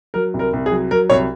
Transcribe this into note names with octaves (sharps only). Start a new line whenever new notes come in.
F#3 A#4
C2
A#4
C2
G#4
F#3
F#3 A#4
C2 C#5